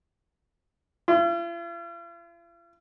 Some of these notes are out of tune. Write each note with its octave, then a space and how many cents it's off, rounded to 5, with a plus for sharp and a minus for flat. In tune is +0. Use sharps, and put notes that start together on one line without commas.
F4 -45